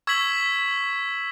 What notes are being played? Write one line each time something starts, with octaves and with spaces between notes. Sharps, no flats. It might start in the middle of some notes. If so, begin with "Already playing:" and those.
C#6 E6 G#6 B6 F#7